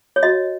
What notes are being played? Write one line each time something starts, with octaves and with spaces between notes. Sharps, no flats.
C#5
F#4 D#5